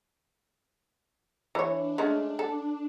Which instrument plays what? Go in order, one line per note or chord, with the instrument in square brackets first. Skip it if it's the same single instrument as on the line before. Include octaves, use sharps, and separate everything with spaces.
[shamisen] E3 C#5 [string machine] D4
[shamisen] G#3 A3 C#4
A4